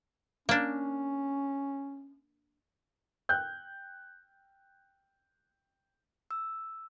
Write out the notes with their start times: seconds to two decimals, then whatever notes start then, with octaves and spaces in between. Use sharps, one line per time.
0.49 A#3 C#4 D4
3.29 G5 F#6 G6
6.31 E6